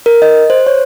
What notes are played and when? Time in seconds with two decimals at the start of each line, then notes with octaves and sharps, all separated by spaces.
0.06 A#4
0.22 D#5
0.50 C5
0.67 C#5